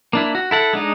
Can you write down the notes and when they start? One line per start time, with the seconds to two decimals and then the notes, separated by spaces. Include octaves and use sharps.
0.13 A#3 D4 E4
0.35 F#4
0.51 E4 A4 F#5
0.73 G#3 D4 D#4